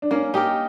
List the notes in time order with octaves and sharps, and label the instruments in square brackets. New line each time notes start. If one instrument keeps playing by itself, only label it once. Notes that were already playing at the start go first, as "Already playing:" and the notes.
[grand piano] D4
[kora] A#3 [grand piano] C#4
[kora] D#4 G4 A#4